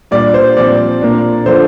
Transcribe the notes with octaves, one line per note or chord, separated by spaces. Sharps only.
A#2 G3 D4 D5
C5
A#2 F3 C4 D5
A#2 A#3 D4
D3 F3 D4 C5